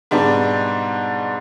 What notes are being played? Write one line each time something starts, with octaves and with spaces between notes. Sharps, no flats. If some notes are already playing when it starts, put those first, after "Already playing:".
G#2 B2 G3 D4